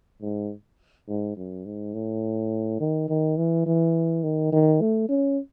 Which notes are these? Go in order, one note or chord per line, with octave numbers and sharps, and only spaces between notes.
G#2
G#2
F#2
G#2
A2
D#3
D#3
E3
E3
D#3
D#3
A3
C#4